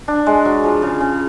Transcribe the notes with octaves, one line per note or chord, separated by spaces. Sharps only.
D4
G#3
F#3
F3
C#3
C#3